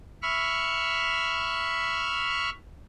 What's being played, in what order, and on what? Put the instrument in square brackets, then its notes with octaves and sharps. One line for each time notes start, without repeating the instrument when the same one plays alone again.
[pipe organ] E5 B5 C#6 F6